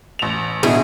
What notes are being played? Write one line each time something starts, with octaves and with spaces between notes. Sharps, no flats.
A1 F7
A1 B2 D3 E4 G#4